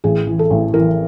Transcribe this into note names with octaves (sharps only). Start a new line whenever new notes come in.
A1 G#4
E3
A4
A1
E3 A#4